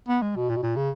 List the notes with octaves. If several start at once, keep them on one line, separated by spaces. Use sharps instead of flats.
B3
G#3
B2
A#2
B2
A#2
C#3